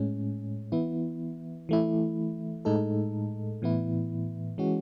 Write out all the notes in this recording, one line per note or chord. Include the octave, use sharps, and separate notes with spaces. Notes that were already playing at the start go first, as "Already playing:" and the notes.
Already playing: A2 G#3 C#4
E3 B3 E4
E3 A3 E4
A2 G#3 D#4 A4
A2 E3 B3 E4
E3 G#3 C#4 F#4